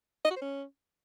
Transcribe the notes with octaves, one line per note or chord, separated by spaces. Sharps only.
D#5
F#4
C5
C#4